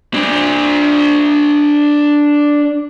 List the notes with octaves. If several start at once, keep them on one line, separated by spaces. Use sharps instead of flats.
D4 C5